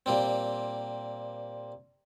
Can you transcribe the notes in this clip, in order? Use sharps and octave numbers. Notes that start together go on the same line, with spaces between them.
A#2 G3 C4